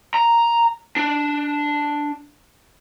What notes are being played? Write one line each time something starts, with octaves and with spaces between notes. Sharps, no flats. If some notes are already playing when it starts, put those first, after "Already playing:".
A#5
D4